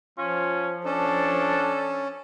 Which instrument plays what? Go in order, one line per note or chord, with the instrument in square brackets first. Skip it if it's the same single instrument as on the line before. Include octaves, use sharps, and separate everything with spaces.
[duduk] F3 [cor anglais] C#4 [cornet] F4
[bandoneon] C#4 [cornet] D4 [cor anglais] A4